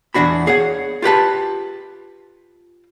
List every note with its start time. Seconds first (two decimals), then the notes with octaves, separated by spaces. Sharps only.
0.14 E2 A#2 D4 F#4 B5
0.47 G#4 C#5 F#5
1.02 F4 G4 B4 A5